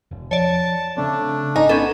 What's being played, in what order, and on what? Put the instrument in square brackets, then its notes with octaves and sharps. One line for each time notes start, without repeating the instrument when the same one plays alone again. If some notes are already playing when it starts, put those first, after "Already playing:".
[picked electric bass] E1
[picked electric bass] F3 [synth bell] C#5 D5 [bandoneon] A5
[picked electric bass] C#3 C4 [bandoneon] A3 D4
[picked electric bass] G#1 [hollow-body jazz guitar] D#4 [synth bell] G#5
[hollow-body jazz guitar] B3 [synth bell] C#4 A4